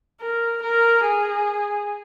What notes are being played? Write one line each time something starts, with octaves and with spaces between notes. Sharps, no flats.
A#4
A#4
G#4